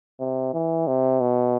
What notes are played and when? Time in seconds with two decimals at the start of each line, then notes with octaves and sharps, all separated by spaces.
0.20 C3
0.54 E3
0.87 C3
1.21 B2